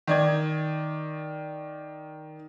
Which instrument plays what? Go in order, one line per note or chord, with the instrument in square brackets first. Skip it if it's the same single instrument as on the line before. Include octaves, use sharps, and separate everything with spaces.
[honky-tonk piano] D#3 D5 G#6